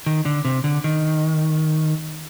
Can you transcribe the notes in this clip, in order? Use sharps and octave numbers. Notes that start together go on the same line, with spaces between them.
D#3
D3
C3
D3
D#3